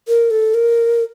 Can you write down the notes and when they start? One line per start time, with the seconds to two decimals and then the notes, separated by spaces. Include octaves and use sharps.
0.08 A#4
0.31 A4
0.54 A#4